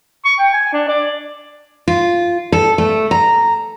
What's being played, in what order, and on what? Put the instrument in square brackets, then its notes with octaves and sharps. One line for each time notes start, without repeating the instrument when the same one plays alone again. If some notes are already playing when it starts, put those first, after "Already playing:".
[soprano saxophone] C#6
G5
G#5
D4
D5
[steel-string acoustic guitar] F4
A4
A3
A#5